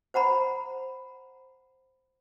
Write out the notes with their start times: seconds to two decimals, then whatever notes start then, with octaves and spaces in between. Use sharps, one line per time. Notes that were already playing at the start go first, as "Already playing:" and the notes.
0.14 C5 F#5 A#5 B5